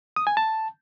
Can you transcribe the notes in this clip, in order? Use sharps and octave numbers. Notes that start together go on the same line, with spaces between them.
D#6
G#5
A5